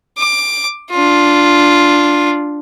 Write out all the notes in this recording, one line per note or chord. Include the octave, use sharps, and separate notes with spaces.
D6
D4 F4